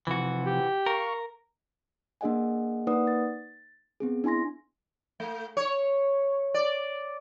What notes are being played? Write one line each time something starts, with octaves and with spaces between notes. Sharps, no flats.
C3 E3 F3 F#4
G4
A#4 F5 C#6
A#3 D4 G#4 D#5 F#5 G#5
A#3 D#4 B4 D5 F#5 D#6
A6
B3 C4 G#4
D4 E4 G#5 C6 A#6
A3
C#5
D5